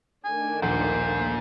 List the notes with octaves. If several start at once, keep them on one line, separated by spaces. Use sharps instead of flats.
D#3 A3 D4 G#5
D#1 A#1 A#2 C5 F#5